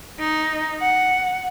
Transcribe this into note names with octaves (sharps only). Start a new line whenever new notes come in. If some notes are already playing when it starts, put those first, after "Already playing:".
D#4
F#5